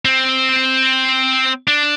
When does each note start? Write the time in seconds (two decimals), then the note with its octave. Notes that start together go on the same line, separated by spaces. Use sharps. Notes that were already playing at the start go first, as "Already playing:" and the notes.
0.05 C4
1.68 D4